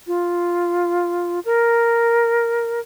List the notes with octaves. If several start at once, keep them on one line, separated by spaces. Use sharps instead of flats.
F4
A#4